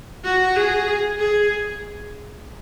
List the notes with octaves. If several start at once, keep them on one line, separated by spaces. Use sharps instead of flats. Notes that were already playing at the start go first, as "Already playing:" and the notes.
F#4
G#4
G#4